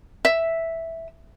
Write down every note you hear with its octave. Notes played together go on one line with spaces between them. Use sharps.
E5